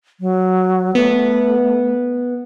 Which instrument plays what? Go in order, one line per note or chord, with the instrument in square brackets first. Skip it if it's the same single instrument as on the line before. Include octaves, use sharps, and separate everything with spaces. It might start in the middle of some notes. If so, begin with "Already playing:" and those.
[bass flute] F#3
[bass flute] A3 [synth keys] B3